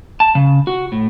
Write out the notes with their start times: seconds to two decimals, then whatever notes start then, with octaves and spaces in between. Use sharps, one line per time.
0.20 A5
0.35 C#3
0.67 F#4
0.92 A2